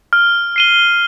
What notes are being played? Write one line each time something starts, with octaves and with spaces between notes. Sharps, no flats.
F6
C7 D#7 G7